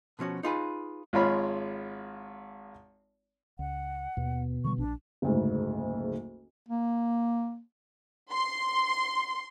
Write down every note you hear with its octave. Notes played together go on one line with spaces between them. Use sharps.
B2 F3 C#4 F#4
D#4 F4 G#4 B4
G#1 G#3 F4 C#5 F5 B5
C#2 F#5
D#2 B2 B3
D3 D#3 G3 C#6
A#1 D4
F#1 D2 G#2
A#3
C6